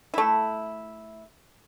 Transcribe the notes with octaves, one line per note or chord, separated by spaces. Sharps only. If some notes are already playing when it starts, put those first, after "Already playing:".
A3 E4